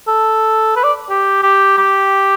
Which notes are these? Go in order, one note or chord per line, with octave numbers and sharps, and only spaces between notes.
A4
B4
D5
G4
G4
G4